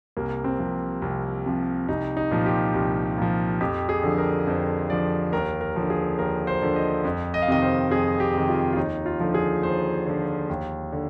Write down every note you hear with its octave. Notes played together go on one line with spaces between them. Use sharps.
C2 A#3
C4
C3 F3
C2
C3 F3
C2 D#4
D#4
A#2 F3
G4
C2
A#2 F3
F2 G4
G#4
D3 F3
A#4
F2 C5
D3 F3 D5
D#2 A#4
A#4
D3 F3
G#4
D#2 A#4
C5
D3 F3
D#5
F2
D#5
F5
C3 D#3 D#5
C5
F2 G#4
G4
C3 D#3
F4
F4
D#2 D#4
F4
D3 F3
G#4
D#2 C5
D3 F3
D#2
D3